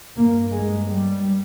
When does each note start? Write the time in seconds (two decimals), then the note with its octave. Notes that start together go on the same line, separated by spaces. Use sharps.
0.17 G2 A#3
0.51 G#3
0.86 G3